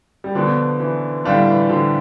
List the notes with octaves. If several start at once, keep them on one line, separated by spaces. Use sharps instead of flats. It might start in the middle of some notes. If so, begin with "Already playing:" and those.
G3
B2 D3 F3 B3 D4
E3
A2 D3 G3 D4 F4
E3
D3 F3